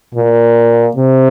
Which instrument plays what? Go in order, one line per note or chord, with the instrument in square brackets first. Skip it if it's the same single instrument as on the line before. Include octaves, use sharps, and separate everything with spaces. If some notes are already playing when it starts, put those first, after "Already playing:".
[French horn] A#2
C3